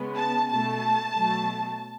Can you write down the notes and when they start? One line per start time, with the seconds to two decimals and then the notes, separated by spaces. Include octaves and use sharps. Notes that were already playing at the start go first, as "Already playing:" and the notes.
Already playing: C#3 G#3 B3
0.17 A5
0.50 B2 A3 A5
1.14 B2 F#3 A3